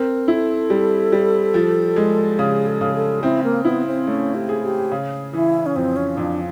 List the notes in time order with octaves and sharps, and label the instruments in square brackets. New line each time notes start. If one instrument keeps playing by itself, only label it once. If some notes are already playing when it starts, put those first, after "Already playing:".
Already playing: [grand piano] C4 [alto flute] A#4
[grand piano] E4 [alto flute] A4
[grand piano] G3
G3
F3
G#3
[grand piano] C#3 [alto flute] G#4
[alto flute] A4
[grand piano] C#3
[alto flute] A4
[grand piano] C4 [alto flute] E4
[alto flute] A#3
[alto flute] B3 [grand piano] E4
[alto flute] C4
[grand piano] A3 [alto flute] C#4
[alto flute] G4
[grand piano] G#4
[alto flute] G4
[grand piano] C#3
[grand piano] E3 [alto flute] E4
[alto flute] C#4
[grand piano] F2 [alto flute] C4
[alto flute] C#4
[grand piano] F2 [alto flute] D4